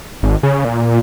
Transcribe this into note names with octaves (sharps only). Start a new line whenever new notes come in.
G#1
C#3
A#2